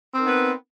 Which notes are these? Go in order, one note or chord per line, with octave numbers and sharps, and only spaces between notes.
B3 C4 D#4 A#4 B4